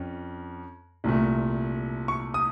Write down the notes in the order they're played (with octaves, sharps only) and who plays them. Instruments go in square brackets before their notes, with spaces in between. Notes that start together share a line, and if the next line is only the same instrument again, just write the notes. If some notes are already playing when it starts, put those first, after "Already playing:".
Already playing: [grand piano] F2 C#4
C2 A#2 A3
C#6
D#6